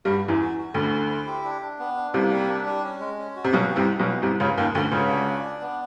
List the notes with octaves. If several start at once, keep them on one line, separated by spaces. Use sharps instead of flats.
G2 G3 F#4
A3
E2 E3
F#4
F#4
D2 D3 E4
C5
E4
G4
D4
D4
B3
D4
C2 C3 A#3
G3
D4
G3
C#4
G#3
C#4
F#4
C3
B1 B2 F#4
C4
C2 C3
D#4
B1 B2
D#4
C2 C3 A3
C#2 C#3 A3
D#2 D#3 A3
D2 D3 A3
C#2 C#3 F#4
D4
D5
D4
B3